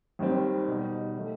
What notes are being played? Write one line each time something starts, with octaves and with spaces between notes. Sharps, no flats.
D#2 D#3 G3 C4
B2 G3 D#4
D#3 A3